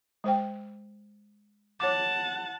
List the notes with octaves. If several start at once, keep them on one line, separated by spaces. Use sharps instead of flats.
G#3 C5 G5
C#5 F#5 A5 D6